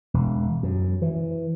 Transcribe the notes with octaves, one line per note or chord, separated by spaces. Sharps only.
E1
F#2
E3